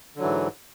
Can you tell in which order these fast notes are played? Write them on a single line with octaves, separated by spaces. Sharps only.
D3 F#3 E3 G#2